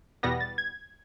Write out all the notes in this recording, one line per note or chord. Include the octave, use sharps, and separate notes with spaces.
E2 B2 G3 B3 A#6
A6
G#6